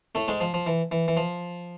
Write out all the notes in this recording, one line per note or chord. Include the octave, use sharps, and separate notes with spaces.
A2 A3
G#2 G#3
F3
F3
E3
E3
E3
F3